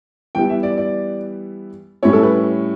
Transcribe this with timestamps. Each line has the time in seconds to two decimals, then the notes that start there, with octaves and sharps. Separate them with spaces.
0.35 E3 G3 B3 E4 G5
0.49 E5
0.63 D5
0.77 D5
2.03 A2 G3 C#4 E4 C#5
2.13 A4
2.23 B4